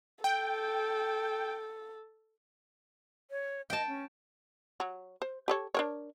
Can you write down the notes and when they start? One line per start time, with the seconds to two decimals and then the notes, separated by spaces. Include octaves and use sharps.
0.24 A4 G5
3.31 C#5
3.70 D#5 G5 A5
3.88 C#4
4.80 F#3
5.22 C5
5.48 G4 A4 C#5
5.75 D4 A#4 C#5